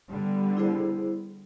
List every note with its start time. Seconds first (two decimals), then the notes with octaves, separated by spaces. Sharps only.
0.11 D3 G3 B3
0.57 E4 G#4 C5